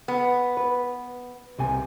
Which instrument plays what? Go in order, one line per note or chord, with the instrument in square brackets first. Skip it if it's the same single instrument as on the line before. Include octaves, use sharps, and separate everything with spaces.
[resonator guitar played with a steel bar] B3
[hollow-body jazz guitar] B4
C2 C3 G#5